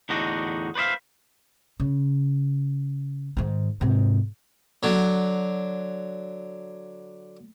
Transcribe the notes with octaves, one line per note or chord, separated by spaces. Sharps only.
E2 A2 D3 D#4 F#4 D#5
B4 C5 D5 E5 F5
C#3
G#2 D#3
G#2 C3
D3 F#3